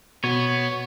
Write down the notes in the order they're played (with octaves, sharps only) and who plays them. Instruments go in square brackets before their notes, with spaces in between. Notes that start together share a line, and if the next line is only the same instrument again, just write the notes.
[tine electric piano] B2 [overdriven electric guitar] B3 [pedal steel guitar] C#5